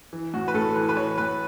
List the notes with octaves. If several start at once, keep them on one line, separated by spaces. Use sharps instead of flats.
E3
A2 F#4
B4
A2 A4
E3 B4
B4
E3 C#5
A2 B4